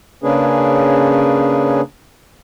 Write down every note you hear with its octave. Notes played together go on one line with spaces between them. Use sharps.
C#3 A#3 C#4 D4 G#4 B4